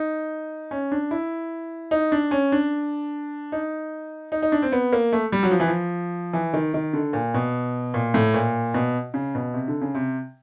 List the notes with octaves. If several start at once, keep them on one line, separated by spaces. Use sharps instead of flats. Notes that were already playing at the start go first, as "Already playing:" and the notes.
Already playing: D#4
C#4
D4
E4
D#4
D4
C#4
D4
D#4
D#4
D#4
D4
C4
B3
A#3
A3
G3
F#3
F3
E3
F3
E3
D#3
D#3
D3
A#2
B2
A#2
A2
A#2
B2
C#3
B2
C3
D3
C#3
C3